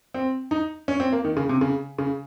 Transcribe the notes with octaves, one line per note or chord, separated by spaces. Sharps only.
C4
D#4
C#4
C4
A#3
D#3
C#3
C3
C#3
C#3